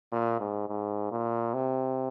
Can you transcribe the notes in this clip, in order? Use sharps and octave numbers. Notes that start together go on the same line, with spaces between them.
A#2
G#2
G#2
A#2
C3